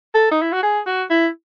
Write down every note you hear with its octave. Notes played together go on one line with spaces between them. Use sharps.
A4
D#4
E4
F#4
G#4
F#4
E4